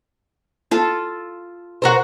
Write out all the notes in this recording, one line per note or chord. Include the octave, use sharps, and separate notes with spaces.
F4 A4
F#4 A#4 C5